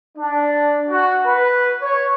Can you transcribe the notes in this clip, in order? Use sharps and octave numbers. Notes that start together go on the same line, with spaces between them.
D4
F#4
B4
C#5